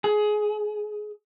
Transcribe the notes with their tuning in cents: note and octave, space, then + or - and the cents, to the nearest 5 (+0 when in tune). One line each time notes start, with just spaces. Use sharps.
G#4 +20